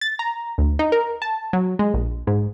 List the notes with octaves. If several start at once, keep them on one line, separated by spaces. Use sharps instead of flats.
A6
A#5
D2
D#4
A#4
A5
F#3
G#3
A#1
G#2